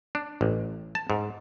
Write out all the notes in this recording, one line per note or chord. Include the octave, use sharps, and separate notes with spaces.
D4
A1
A5
G#2